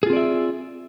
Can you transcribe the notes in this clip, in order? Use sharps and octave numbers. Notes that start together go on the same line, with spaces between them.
C4 F4 G#4 D5 E5